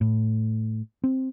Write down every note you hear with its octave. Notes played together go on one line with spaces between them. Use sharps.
A2
C4